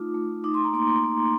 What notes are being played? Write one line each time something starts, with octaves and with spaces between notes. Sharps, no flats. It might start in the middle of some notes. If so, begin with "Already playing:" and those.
Already playing: A3 D#4 F4 D6
A3
D#4 D6
C6
A#5
A#3 C6
C6
A#3